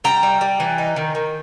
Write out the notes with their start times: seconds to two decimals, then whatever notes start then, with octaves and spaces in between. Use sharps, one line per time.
0.04 G3 G5 A#5
0.23 G3
0.41 G3
0.60 E3
0.78 D#4
0.96 D#3
1.15 D#3